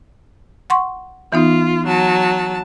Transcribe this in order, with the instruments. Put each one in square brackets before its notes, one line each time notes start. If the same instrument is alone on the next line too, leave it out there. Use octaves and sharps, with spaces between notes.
[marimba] F#5 C6 C#6
[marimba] E3 B3 D#4 [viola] F4
[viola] F#3 A5